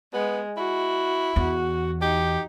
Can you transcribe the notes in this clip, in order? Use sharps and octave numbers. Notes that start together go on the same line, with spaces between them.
G#3 B3
E4 F#4
E2 F#4
D#4 G4